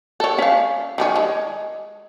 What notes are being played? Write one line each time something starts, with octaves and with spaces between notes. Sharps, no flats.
A4 C#5
C#4 F5
D#3 G3 C#4
G#3